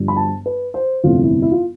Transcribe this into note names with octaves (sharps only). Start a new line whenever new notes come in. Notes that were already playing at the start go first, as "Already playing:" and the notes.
Already playing: G1 G2 F3
B5
A5
B4
C5
G1 F2 C3 E3 A3 F4
E4
E4
F4